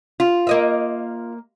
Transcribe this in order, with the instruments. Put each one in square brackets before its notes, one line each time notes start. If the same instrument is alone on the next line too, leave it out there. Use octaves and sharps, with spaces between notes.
[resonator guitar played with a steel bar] F4
[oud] A#3 D#5 E5